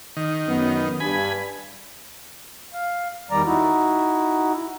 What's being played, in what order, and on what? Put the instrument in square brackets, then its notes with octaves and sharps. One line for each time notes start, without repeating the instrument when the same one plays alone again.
[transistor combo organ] D#3
[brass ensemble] F#2 B3
[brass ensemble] G2 [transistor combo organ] G#5 B5
[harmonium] F5
E2 D#3 G3 D5 A#5
D#4 E4 F#4